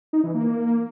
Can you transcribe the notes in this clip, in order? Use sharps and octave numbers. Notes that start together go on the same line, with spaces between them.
D#4
E3
A#3
A#3